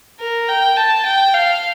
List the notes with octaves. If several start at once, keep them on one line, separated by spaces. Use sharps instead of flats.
A#4
G5
A5
G5
F5